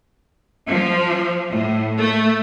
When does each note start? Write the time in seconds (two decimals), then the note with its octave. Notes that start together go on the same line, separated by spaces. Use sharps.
0.67 F3
1.52 A2
1.99 A3